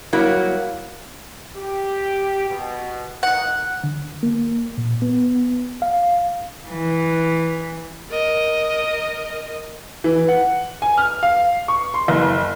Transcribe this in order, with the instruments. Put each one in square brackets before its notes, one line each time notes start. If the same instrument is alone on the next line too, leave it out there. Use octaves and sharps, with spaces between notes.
[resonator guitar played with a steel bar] F#3 G3 A#3 E4 F#4
[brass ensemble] G4
B2
[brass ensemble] D#3 D#4 [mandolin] F#5
[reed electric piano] D3
A#3
A#2
B3
F5
[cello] E3
[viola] A#4 D#5
[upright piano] E3
F#5
G#5
F6
F5
C#6
C6
F#1